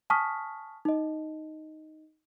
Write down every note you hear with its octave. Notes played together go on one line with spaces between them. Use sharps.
G#5 A5 C#6 D#6 F6 B6
D#4 D#5